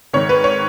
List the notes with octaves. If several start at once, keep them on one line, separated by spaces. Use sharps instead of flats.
G#2 D#3 C#5
B4
C#5